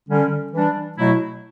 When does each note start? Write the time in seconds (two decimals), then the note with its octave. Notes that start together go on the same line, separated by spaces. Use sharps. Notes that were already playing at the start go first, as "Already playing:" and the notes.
0.09 D3 G3 C#4
0.53 E3 G3 D4
0.98 B2 F#3 A3 E4